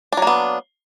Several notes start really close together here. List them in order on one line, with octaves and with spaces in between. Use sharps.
D4 F#3 A#3 B3